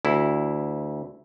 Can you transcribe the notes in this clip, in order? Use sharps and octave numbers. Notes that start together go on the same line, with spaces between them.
D2 E4